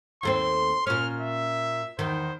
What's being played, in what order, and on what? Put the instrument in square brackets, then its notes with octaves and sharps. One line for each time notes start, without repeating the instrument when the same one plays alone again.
[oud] D#2 A3 C4 [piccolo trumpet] C6
[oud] A#2 C#4 [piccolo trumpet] F6
[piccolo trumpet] E5
[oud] E2 D#3 [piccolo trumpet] C5